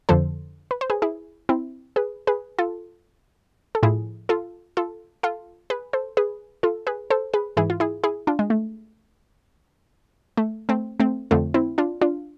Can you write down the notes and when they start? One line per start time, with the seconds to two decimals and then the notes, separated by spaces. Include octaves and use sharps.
0.09 F2 D3 F3 A4 C5
0.71 B4
0.81 C5
0.90 G#4 B4
1.02 E4 G#4
1.49 C4 E4
1.96 G#4 B4
2.27 G#4 B4
2.59 F4 A4
3.75 A4
3.83 A2 F3 E4 G#4
4.29 F4 A4
4.77 F4 A4
5.23 F4 A4
5.70 G#4 B4
5.93 A4 C5
6.17 G#4 B4
6.63 F4 A4
6.87 G#4 B4
7.10 A4 C5
7.34 G#4 B4
7.57 G#2 E3 E4 G#4
7.70 F4
7.80 E4 G#4
8.04 E4 G#4
8.27 D4 F4
8.39 G#3
8.50 A3
10.37 A3
10.69 A3 C4
11.00 A3 C4
11.31 F2 D3 F3 A3 C4
11.54 C4 E4
11.78 D4 F4
12.01 D4 F4